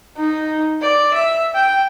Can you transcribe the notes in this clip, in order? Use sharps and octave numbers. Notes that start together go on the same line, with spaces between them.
D#4
D5
E5
G5